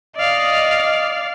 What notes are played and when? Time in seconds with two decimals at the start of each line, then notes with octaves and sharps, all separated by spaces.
0.16 D5 D#5 F5